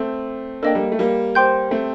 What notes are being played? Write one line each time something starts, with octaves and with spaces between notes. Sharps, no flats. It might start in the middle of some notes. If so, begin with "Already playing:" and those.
Already playing: A3 C4
A#3 D4 A4 D#5 G5
G3 A#3
A3
G3 A#3
G4 C5 G5 C6 G6
A3 C4